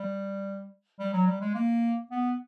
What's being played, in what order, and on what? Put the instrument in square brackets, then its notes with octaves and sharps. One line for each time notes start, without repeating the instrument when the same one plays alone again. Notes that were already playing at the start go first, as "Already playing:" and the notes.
Already playing: [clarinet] G3
G3
F#3
G3
G#3
A#3
B3